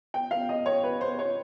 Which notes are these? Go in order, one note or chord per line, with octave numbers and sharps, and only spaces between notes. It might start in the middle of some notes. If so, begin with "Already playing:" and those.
G5
F5
D#5
C#5
B4
C5
C#5